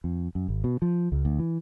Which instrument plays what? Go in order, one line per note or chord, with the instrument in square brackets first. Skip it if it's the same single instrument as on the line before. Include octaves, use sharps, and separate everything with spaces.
[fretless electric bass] F2
F#2
G#1
B2
F3
C#2
D2
E3